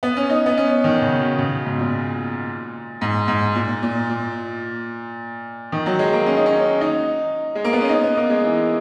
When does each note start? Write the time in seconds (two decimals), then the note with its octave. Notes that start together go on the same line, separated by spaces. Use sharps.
0.03 B3
0.17 C#4
0.30 D#4
0.46 B3
0.57 C#4
0.84 D#3
1.02 C#3
1.20 B2
1.38 C#3
1.52 B2
1.65 G#2
1.79 A#2
3.01 G#2
3.28 G#2
3.55 A#2
3.83 A#2
4.09 A#2
5.72 D#3
5.86 F#3
5.99 G#3
6.13 A#3
6.26 C#4
6.37 D#4
6.46 C#4
6.81 D#4
7.55 G#3
7.64 A#3
7.73 B3
7.81 C#4
7.89 D#4
8.03 B3
8.17 A#3
8.30 G#3
8.44 E3